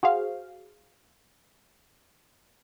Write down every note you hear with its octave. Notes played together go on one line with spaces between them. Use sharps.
F#4 G#4 C5 F5